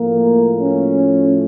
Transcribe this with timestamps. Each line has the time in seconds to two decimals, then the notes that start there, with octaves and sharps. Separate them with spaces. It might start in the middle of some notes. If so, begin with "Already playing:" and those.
Already playing: A2 F3 A3 A#3
0.58 C#4